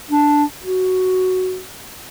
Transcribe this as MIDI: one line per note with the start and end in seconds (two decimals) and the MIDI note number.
0.11 0.44 62
0.63 1.59 66